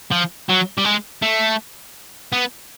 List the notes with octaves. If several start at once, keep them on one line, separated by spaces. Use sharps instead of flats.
F3
F#3
G3
G#3
A3
B3